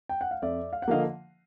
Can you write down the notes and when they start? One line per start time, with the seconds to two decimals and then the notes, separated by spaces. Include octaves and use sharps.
0.09 G5
0.21 F#5
0.31 F5
0.42 F2 D5 E5
0.73 F5
0.82 F#5
0.88 D3 F3 A#3 D#5 F5